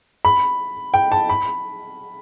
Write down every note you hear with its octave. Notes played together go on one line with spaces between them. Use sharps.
B5
G5
A5
B5